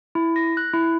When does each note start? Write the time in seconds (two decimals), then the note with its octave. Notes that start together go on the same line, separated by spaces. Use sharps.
0.15 E4
0.36 A#6
0.57 F#6
0.74 E4